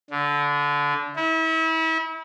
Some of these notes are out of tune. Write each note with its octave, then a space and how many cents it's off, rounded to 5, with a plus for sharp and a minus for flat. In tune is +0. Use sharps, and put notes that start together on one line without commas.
D3 -20
E4 -35